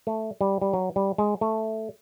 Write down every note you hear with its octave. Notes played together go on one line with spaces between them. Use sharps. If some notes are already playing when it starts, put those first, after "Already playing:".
A3
G3
G3
F#3
G3
G#3
A3